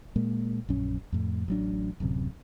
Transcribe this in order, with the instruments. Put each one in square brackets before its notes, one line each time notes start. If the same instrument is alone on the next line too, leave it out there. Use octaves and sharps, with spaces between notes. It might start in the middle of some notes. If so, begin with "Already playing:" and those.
[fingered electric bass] A#2 G#3 A#3
A#1 F#2 C#4
F2 A2
A1 F#3 D4
D1 F#2 C3